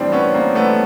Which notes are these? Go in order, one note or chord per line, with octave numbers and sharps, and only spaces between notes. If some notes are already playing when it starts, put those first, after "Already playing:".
Already playing: A2 E3 G3 C4 D4
B3 C#4
A#3 C4
A3 B3